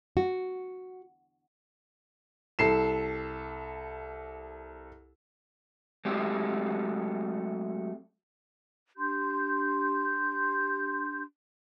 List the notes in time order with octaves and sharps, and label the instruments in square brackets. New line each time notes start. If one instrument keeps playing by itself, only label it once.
[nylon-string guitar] F#4
[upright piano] C2 A4 C7 E7
[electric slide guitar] F#3 G#3 A3 C4 G4
[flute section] D4 G4 C6 G6